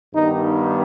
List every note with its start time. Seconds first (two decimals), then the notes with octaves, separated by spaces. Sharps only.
0.14 G2 D#3 G3 B3 D#4